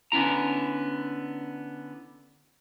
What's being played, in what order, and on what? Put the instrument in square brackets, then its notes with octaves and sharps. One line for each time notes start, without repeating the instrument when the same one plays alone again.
[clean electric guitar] D3 B3 C#4 E4 A#5